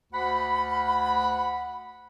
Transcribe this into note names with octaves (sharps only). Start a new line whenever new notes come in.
D2 F#5 B5